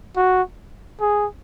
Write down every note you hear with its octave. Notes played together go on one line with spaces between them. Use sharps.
F#4
G#4